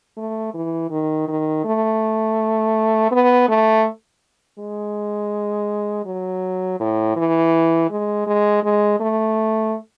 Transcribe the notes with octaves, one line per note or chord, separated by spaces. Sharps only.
A3
E3
D#3
D#3
A3
B3
A3
G#3
F#3
A2
E3
G#3
G#3
G#3
A3